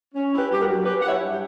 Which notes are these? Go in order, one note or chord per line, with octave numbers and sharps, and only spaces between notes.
C#4
E4
G4 B4
G2 G4
F#4 A#4
F#3
C#4 G4 B4
E4 F#5
C#5 E5
G2
G4